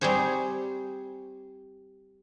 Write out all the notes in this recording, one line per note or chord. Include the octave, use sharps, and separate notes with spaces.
G3 C4 G#4 C5 C#5